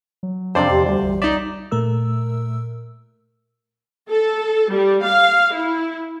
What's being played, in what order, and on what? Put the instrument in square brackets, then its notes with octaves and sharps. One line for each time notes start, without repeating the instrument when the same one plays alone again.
[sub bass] F#3
[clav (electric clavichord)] F2 C3 [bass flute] D4 [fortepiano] C5 D5
[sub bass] E2 [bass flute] G4
[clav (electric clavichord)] D2 [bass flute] G3
[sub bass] A1
[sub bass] C2 [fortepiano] D#4 D5 [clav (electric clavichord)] E5
[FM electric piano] A#2 A3 A#4 E6
[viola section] A4
G3
F5
E4